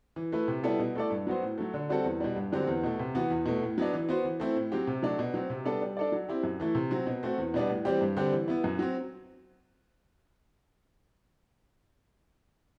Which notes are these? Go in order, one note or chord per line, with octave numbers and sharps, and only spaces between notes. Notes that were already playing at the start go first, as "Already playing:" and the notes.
E3
A3 E4 B4
C3
G3 B3 E4 A4
B2
A3 E4 A4 D5
G2
F#3 B3 F#4 C5
A2
F#3 A3
D3
G3 C4 F#4 A4
E2
B2 G3
G2
D3 F#3 C4 G4
E2
B2 A3
C3
E3 B3 F#4
E2
B2 A3
A2
F#3 B3 D4
E3
B3 F#4 C5
E3
A3 C4 E4
A2
F#3 C4 G4 C5
C3
F#3 A3 D4
B2
F#3 C4
C3
G3 B3 D4 A4
G3
D4 A4 D5
F#3
C4 E4 G4
F#2
E3 A3 E4
C3
F#3 C4
B2
A3 C4 F#4
E2
B2 G3 B3 D4
A2
E3 G3 C4 G4
G2
D3 G3 C4 G4
E3
B3 E4
F#2
F#3 C4